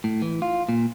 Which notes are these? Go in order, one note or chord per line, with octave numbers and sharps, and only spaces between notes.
A2
E3
F4
A#2